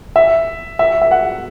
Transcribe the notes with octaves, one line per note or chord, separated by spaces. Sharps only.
E5
E5
E5
F#5